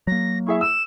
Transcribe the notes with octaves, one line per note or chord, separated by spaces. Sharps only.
F#3 A#3 A#6
E4 G#4 E5 C#6
E6 E7